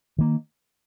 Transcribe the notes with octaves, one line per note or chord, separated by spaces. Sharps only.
D#3 A#3